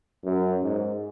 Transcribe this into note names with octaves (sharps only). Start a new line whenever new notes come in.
F#2
G#2